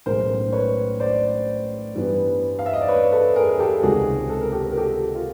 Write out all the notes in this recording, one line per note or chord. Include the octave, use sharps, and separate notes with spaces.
B1 A2 E3 G#3 C#4 A#4 C5
B4 C#5
C5 D5
G2 E3 G3 B3
F5
E5
D#5
D5
B4 C#5
A4 B4
G#4 A#4
A#4
G4 A4
C#2 C3 D#3 G#3 F#4 G#4
A4
A#4
G4 A4
A#4
G4 A4
F4